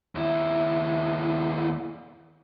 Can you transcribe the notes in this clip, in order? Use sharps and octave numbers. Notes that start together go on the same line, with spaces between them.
D#2 E4